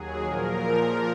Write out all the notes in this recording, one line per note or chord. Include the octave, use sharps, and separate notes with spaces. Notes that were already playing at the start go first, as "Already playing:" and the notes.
Already playing: D#2 F#3 G#4
A#2 F3 A#4